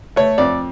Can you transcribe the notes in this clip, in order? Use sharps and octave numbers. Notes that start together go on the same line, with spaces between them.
A3 C#5
F2 D5